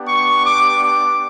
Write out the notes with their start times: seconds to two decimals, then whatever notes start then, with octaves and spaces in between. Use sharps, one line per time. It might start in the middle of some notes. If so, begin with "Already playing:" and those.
Already playing: B3 D4 G4
0.08 C#6
0.46 D6
0.83 D6